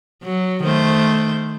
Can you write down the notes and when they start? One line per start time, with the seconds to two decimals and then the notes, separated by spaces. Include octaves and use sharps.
0.24 F#3
0.63 D#3 A3 C5